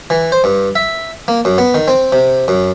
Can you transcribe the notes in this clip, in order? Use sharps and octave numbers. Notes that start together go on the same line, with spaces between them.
E3
C5
G2
E5
A#3
F#2
B3
D#3
C4
C3
F#2